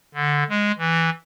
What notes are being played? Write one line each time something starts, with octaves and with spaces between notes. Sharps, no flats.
D3
G#3
E3